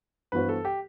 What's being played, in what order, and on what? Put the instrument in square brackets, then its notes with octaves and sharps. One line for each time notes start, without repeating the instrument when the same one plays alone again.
[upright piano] G2 E3 B3 F#4 C5 [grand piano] B4
[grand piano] A4
G4